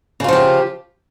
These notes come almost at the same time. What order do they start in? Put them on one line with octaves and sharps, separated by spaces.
C#3 F4 F3 G4